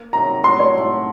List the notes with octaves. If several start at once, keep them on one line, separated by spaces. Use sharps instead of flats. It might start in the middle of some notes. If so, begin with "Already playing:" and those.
Already playing: A#3
C3 D#3 F#3 A#5
A2 A3 D#4 F#4 C6
C#5
A2 A3 D#4 F#4